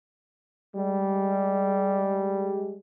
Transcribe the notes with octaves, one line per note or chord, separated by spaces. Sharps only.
G3 G#3